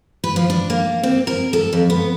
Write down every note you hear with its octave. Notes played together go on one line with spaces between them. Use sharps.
B4
F3
D4
A#3
C4
A#4
A4
F2
B3